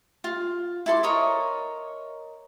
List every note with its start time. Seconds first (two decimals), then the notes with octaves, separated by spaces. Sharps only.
0.24 F4
0.86 E4 A4 C6 D6
1.03 A#4 C#5 D#5